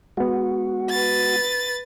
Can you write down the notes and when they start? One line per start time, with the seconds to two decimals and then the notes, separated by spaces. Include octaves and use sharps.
0.17 G#3 B3 F#4
0.90 B4 A6